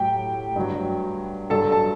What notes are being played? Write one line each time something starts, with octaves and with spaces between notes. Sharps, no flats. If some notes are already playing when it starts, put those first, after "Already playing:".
Already playing: A2 F#3 G4 G5
G2 F#3
G2 F#3 A4 A5
A5